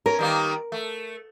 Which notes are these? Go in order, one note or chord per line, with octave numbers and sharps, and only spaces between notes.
C#4 A#4
D#3 G3 A#3
A3